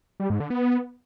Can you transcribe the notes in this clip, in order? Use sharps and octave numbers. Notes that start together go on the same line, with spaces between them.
G3
G#2
D3
B3